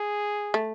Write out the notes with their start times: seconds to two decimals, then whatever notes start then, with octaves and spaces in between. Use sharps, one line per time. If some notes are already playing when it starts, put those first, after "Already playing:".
Already playing: G#4
0.54 A3